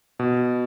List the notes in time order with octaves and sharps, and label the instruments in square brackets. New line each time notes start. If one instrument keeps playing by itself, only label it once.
[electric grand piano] B2